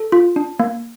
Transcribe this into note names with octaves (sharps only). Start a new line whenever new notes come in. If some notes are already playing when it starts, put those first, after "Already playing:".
Already playing: A4
F4
D4
A#3